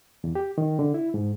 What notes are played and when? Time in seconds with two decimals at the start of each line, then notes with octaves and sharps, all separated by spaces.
0.24 E2
0.35 G4
0.58 D#3
0.79 D3
0.94 E4
1.14 G#2